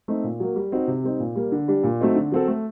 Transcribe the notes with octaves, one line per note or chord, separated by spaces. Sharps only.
A3 C4 D#4
A#2
F#3 A#3
G3
C4 D#4 F#4
C3
G3 C4 D#4
A#2
G3 A#3
D3
G3 D4 G4
A#2
F#3 A3 C4 D#4
D3
F#3 C4 F#4 A4
A3